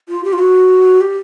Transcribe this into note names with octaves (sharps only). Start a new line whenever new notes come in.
F4
G4
F4
F#4
G4